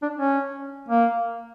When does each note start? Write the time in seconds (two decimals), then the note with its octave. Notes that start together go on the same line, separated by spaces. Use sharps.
0.03 D4
0.17 C#4
0.89 A#3